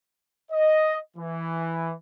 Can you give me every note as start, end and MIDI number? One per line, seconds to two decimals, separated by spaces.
0.51 0.98 75
1.17 1.94 52